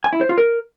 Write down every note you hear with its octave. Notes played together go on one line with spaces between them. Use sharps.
G#5
E4
C5
F4
A#4